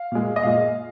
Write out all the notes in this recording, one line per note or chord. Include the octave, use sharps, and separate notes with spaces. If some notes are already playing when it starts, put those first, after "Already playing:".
Already playing: F5
A#2 G#3
D#5
A#2 G#3 F5